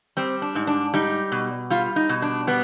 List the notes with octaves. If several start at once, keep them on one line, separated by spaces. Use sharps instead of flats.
G3 C4
D4
G#2
D4
G3 D#4
B2
G3 F4
D#4
B2
D4
G3 B3